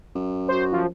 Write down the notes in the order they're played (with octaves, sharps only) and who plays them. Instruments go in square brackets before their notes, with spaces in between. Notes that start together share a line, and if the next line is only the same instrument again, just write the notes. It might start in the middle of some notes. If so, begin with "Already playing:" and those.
[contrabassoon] F#2
[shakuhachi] F#4 [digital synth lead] C5
[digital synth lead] F3